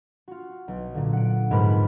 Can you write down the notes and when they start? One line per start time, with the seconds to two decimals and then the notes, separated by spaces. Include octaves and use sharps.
0.28 F4 F#4
0.68 B1
0.94 A#2 D3
1.13 F#5 D7
1.51 F2 G#2 G#3 A#4 B4 B5